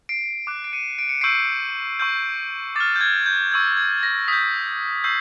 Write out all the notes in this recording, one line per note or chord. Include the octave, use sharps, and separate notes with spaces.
C7 D7
D6 F#6
D7
C#7 D#7
D7
C#7
C#6 E6 G6 C7 D7
C#6 E6 G6
D6 F6 A6
G6
G#6
G6
C#6 E6 G6 G#6
G#6
A#6
D#6 G6 B6
C#6 E6 G6 C7